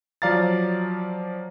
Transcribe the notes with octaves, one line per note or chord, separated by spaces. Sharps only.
F3 F#3 D5 F5 A#5 A6